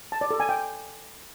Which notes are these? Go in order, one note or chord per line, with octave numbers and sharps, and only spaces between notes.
A5
D5
A4
G#5
G5